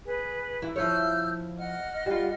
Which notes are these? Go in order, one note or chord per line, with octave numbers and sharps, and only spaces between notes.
G#4 B4
E3 E4
F3 E4 C#5 E6 F6 G6
D#5 F#5 F6
G3 F4